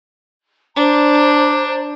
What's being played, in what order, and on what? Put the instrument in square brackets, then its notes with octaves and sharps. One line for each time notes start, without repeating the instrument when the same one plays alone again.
[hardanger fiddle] D4 [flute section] C5 A#5